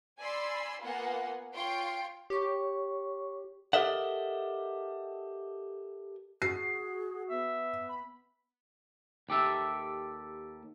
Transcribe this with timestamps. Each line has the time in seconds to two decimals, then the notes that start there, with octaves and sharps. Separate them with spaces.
0.20 D5 G#5 B5 C6 E6
0.81 A#3 B3 F4 F#5 G#5
1.53 F4 C#5 G5 C6 D7
2.30 G4 C#5 C#6
3.73 G4 A4 A#4 D#5 E5 F#5
6.42 F#4 G#4 C7
7.30 B3 E5
7.89 B5
9.29 D#2 G4 A4 E5